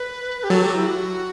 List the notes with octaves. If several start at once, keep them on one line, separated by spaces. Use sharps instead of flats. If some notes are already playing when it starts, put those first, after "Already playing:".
Already playing: B4
G4
F#3 A4
G4
E4
F#4